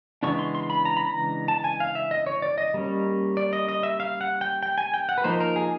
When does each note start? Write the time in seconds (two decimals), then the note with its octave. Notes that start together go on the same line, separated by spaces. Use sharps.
0.23 C#3 E3 G#3 B3 D4 C#6
0.39 C6
0.55 C6
0.70 B5
0.85 A#5
0.97 B5
1.07 A#5
1.48 A5
1.64 G#5
1.80 F5
1.95 E5
2.11 D#5
2.26 C#5
2.42 D5
2.58 D#5
2.74 G3 A#3 C#4
3.37 D5
3.53 D#5
3.69 D#5
3.83 E5
4.00 F5
4.21 F#5
4.41 G5
4.63 G5
4.78 G#5
4.94 G5
5.09 F#5
5.18 B4
5.24 F3 A#3 D#4 C5
5.40 A#4
5.56 G#4